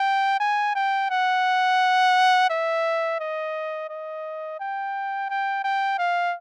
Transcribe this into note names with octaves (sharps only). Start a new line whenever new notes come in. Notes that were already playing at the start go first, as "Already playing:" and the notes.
Already playing: G5
G#5
G5
F#5
E5
D#5
D#5
G5
G5
G5
F5